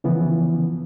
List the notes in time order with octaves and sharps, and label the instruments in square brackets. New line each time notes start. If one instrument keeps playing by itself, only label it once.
[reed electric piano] C#3 E3 F3 B3